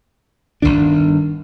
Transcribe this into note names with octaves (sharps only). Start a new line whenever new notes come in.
G1 C2 D#3 D4